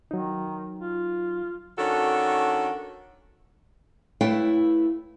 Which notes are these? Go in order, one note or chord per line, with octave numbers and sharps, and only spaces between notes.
D#3 F#3 D#4
F4
D#3 C#4 D4 F#4 A4
A3 E4 B4 C#5 F5 G5